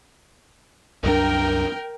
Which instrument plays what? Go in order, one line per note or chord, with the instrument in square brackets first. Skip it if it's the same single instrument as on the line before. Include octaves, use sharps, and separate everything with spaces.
[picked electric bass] C2 F#2 D4 [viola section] A#4 G5